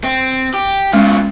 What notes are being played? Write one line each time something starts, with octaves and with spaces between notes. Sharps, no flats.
C4
G4
B2 G#3 C#4 F4